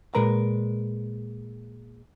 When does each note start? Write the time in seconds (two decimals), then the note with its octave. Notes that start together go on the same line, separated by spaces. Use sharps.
0.15 A#2 G#3 A#4 B4 A#5